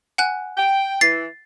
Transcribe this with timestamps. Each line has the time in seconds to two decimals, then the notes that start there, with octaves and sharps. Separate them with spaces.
0.18 F#5 G#5 F#6
0.57 G5
1.01 E3 A6 C7